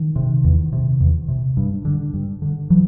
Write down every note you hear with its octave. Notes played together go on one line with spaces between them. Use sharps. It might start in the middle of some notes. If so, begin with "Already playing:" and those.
Already playing: D#3
C3
E2
C3
E2
C3
G2
D3
G2
D3
E3 F#3